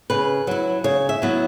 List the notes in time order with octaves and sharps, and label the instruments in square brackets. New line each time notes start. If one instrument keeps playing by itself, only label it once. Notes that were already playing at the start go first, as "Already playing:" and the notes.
[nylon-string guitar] C#3 B4
F#3 E4
C#3 C#5
E5
F#3 B3 E4